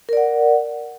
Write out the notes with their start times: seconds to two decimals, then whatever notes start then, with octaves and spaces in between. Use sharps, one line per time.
0.09 A#4
0.13 D5
0.17 F#5